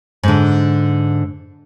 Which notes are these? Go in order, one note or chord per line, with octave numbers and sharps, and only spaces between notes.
G#2 D3